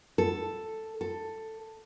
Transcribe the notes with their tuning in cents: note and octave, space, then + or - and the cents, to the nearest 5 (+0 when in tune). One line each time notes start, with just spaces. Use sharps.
A4 +5
A4 +10